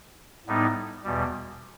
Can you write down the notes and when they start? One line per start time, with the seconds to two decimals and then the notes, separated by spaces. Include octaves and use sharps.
0.47 A2 G3 B3 D#4
1.04 E2 B2 G3